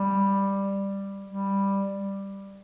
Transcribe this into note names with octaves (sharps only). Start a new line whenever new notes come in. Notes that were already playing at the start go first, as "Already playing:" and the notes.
Already playing: G3
G3